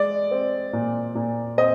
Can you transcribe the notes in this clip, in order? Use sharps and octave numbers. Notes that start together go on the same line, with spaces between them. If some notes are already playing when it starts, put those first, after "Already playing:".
Already playing: G#3 D5
C4
A#2
A#2
C4 D#5